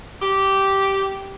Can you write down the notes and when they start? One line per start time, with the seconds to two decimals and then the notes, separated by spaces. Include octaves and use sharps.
0.22 G4